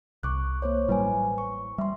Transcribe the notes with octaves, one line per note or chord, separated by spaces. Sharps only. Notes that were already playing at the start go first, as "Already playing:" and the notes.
C2 C#6 D6 F#6
A#3 C5 C#5
A1 F#3 G3 E4 B4 G#5
C#6
G3 E5 C6